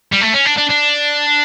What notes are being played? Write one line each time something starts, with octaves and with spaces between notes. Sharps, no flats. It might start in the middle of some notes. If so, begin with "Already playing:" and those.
G3
A3
C#4
D4
D4
D4